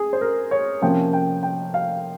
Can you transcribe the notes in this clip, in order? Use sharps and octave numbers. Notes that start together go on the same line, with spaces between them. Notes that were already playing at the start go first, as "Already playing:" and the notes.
Already playing: G#4
C5
A#4
C#5
C3 F3 A#3 C#4 G5
G5
G5
F5